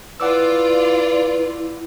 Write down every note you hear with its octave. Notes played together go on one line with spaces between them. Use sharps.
E4 F4 B4 D5 F#5 D6 E6